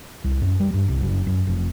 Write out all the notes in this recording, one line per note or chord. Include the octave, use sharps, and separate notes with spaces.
C2
F#2
G3
G2
C2
F#1
F#2
F1